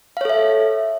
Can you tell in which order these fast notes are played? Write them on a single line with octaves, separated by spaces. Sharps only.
F5 C#5 A4 E5